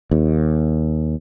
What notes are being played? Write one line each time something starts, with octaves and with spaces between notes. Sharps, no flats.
D#2